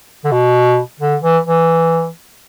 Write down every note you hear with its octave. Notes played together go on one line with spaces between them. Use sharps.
D3
B2
D3
E3
E3